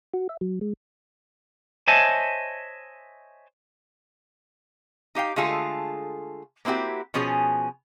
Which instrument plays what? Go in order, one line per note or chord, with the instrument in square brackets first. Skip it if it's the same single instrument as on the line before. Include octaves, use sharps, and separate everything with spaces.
[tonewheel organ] F#4
E5
F#3
G#3
[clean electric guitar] C5 C#5 D#5 E5 G#5 A5
[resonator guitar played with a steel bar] D#4 G4 F5 G5
D3 G#3 A3 F4 G#4 A4
A#3 C4 E4 F#4 G4
B2 F3 C#4 G#4 G#5